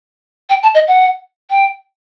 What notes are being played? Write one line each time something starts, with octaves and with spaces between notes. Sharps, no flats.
G5
A5
D#5
F#5
G5